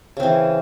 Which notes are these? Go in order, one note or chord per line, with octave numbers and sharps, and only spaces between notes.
C#3 E3 C4